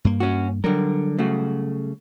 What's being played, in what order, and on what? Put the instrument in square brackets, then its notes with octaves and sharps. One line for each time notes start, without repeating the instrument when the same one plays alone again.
[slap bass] G2 A#3
[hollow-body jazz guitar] C#4 F#4
[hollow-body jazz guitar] D3 A#4 [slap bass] F#3 G3
[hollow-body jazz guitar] C#3 A3 F#4